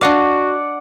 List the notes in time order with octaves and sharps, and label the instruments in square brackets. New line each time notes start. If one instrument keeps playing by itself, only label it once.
[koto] D4 D#5 F5 [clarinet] F#4 [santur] D5 F#5